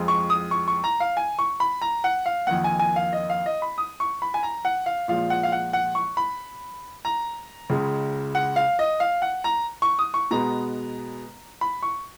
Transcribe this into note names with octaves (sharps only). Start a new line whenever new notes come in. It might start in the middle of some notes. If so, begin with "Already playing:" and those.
Already playing: F2 F3 G#3
C#6
D#6
C#6
C#6
A#5
F5
G#5
C#6
B5
A#5
F#5
F5
F2 D#3 A#3 F#5
G#5
G#5
F5
D#5
F5
D#5
B5
D#6
C#6
B5
G#5
A#5
F#5
F5
A#2 F3 G#3 F5
F#5
F5
F#5
F#5
C#6
B5
A#5
C#2 C#3 G#3
F#5
F5
D#5
F5
F#5
A#5
C#6
D#6
C#6
B2 G#3 B3 A#5
B5
C#6